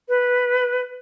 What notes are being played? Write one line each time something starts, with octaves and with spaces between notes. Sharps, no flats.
B4